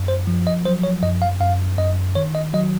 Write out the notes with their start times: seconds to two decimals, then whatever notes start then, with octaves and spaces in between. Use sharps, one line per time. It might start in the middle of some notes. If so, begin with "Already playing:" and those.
Already playing: F#2
0.08 C5
0.27 F3
0.47 D#5
0.65 F#3 C5
0.83 C#5
1.03 F#2 D#5
1.22 F5
1.41 F#2 F5
1.78 F#2 D#5
2.16 D#3 C#5
2.35 D#5
2.54 F#3 D#5